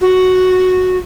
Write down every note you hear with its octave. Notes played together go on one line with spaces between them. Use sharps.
F#4